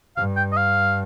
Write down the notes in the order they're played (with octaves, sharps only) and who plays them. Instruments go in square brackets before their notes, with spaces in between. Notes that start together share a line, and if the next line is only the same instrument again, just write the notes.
[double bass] G2 [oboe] F5
[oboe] G5
D#5
F5